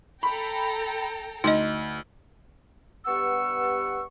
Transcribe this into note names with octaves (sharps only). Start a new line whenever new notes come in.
A4 G5 A#5 B5
D2 D#4 D#5
G2 B3 G4 F#5 C#6 E6